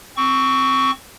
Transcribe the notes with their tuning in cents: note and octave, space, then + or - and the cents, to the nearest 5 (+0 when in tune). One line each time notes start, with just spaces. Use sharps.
C4 +5 C#6 +15